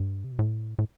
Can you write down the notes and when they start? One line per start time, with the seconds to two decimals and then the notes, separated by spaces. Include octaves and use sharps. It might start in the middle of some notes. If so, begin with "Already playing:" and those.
Already playing: G2
0.24 C3
0.32 B2
0.39 A2
0.79 A2